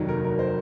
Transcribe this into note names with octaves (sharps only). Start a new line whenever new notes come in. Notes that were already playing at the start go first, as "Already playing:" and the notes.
Already playing: F1 D#2 D#3 F#3
A#4
A#4
C5